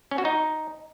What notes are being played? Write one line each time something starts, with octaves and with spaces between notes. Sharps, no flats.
C#4
F#4
D#4